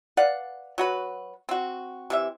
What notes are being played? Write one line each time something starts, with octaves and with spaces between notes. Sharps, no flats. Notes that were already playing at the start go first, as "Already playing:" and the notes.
B4 D5 F5 F#5
F#3 F#4 B4
C4 F#4
C3 E3 E5